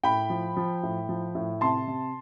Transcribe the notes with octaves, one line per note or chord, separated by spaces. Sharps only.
A2 G5 B5
F3
F3
A2
F3
A2
C3 A5 C6
C3